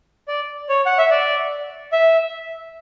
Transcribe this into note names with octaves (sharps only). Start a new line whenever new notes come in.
D5
C#5
F#5
E5
D5
E5